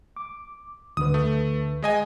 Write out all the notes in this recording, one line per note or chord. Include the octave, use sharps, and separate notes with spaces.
D6
D2 D3 B4 D#6
A3
G#3 D#5 G#5